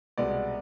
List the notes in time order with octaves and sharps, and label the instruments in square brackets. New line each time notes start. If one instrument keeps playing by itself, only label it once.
[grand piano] C2 B2 G#3 B3 D5